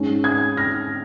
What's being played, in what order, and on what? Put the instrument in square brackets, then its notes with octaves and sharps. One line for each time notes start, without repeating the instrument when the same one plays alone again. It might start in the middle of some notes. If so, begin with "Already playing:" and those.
Already playing: [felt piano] G#2 G#3 C#4
D#6 G#6
F6 A#6